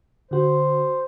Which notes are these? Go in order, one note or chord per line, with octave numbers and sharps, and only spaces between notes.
D3 F#4 C5